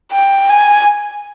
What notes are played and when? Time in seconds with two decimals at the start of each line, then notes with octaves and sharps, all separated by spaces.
0.12 G5
0.49 G#5